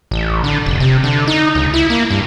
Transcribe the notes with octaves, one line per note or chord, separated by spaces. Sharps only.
A1
D3
F1
C3
D3
D#4
C#2
E4
A#3
G2